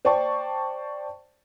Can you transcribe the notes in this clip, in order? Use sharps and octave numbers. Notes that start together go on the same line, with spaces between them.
C5 D5 G5 A5 C#6